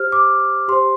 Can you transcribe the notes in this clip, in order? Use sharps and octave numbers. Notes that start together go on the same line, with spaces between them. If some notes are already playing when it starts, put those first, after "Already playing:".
Already playing: G4 C5 F6
D6
G4 C5 C6